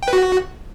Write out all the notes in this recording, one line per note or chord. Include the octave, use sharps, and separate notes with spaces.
G5
B4
F#4